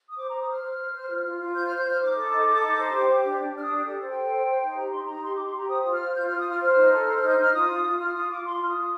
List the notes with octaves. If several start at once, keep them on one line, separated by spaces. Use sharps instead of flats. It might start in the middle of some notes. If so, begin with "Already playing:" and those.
D#6
C5 D6
C5 A#5
D#6
C5 F6
C5
C5
C5
F4
F4
F4
C5 G6
C5 F6
G6
C5 F6
D#4 D6
A4
D#4
A4
D#4
C5
G4
G4
D4
D4
D4 F6
D#6
G4
A4
C5
G5
A4
C5
C5
D#4
G4 A#5
D#4 C6
D#4 A#5
G4 C6
G4 D6
C6
G4 A#5
C5 D#6
F4 D#6
F6
C5
F4 G6
F4 F6
D#6
F4 F6
C5 F6
D#4
A4
C5
D#4 G6
D#4 F6
F4 D#6
F4
F4
F4 F6
F4 D#6
F4 D6
F4 C6
F4 F6
D#6
F4